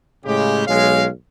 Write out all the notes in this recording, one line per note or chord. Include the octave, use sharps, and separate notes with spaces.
A2 C#3 G#3 G4
B1 G#3 C#5 F5